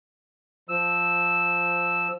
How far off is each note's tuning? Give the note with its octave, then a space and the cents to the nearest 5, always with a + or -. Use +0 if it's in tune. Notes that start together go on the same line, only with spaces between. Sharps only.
F3 +0 E6 -5